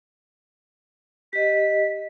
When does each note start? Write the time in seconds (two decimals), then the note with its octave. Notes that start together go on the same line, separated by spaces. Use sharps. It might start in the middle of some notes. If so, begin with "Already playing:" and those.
1.33 G4 D#5 B6